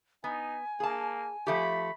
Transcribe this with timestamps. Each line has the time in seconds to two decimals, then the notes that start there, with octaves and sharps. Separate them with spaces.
0.24 B3 D#4 G#5
0.80 A#3 G#4 A5
1.47 F3 A3 G4 B5